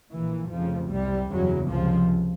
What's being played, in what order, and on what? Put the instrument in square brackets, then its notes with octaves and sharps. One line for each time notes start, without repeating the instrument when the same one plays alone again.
[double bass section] A#1 A#2 E3
F1 F2 C#3 F3
C2 C3 G3
F#1 E2 C#3 F#3
C#2 C3 F3